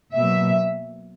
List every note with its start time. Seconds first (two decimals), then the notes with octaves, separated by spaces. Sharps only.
0.15 B2 F#3 A#3 E5